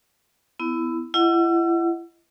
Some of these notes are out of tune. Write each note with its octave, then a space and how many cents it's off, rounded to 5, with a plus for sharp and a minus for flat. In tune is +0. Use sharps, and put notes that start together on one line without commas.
B3 +25 E4 +0
E4 +35 D#5 +25 F#5 +0